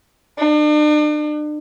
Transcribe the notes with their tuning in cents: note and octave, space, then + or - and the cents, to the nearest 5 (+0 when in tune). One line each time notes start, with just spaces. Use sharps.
D4 +40